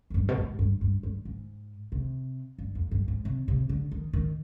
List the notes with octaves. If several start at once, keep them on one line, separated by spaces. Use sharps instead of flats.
F2
G2
B2
G#2
G2
G2
G2
G#2
C3
G2
F2
G2
G#2
C3
C3
D3
D#3
D#3